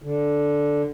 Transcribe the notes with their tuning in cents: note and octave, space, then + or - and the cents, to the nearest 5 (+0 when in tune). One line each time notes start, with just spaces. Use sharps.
D3 -5